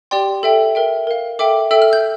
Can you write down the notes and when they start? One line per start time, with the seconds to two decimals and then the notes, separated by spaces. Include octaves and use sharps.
0.11 G4 D5 G5 C6
0.43 A4 E5 G5
0.75 A#4 E5 G5
1.07 A#4 F5
1.39 A4 E5 G5 D6
1.71 A4 E5 G5 E6
1.82 F6
1.93 G6